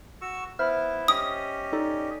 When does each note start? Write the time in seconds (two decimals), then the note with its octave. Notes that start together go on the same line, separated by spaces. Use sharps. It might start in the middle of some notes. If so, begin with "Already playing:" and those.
0.21 F#4 C#6 E6
0.59 B3 E4 C5 E5 F6
1.08 C#4 G4 D#5 D#6
1.73 D#4 A4 D5